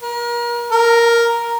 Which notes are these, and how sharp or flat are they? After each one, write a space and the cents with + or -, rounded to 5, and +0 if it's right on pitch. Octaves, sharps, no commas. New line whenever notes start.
A#4 +35
A#4 +5